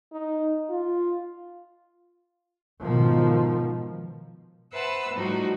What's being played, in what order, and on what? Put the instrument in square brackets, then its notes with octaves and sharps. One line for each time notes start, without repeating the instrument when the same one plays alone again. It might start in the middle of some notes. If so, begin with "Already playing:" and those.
[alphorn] D#4
F4
[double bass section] G#2 B2 D#3 F3
[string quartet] B4 C5 E5 F#5 A5 E6
A2 F3 G3 D#4 F#4